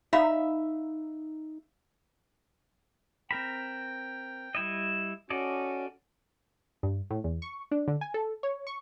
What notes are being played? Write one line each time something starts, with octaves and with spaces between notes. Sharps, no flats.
D#4 E5 F5 B5
C4 A#4 G5 B5
G3 E4 D#5
C#4 F#4 A4 D5 D#5
G2
A2
E2
C#6
D4
D3
G#5
A4
C#5
C#6